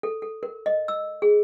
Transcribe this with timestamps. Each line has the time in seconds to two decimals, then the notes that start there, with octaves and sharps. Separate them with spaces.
0.03 A4
0.22 A4
0.43 A#4
0.66 D#5
0.88 E6
1.22 G#4